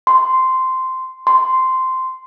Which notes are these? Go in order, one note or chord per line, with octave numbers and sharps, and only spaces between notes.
C6
C6